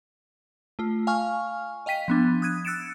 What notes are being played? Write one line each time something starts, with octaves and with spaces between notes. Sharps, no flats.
A3 F4
F5 G#5 C#6 F6
D#5 F5 G5 B6 D#7
F3 B3 D4
D#6 F#6 G#6 D#7
E6 F#6 A6 C#7 D7 E7